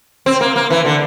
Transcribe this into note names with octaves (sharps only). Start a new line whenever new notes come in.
C4
A#3
A#3
E3
D3